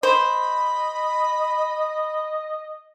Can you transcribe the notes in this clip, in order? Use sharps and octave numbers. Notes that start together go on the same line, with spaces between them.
C5 D#5 B5